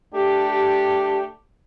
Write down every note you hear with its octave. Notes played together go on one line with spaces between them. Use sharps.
A3 D4 G4